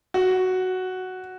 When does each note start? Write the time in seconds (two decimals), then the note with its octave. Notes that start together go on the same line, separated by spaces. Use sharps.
0.14 F#4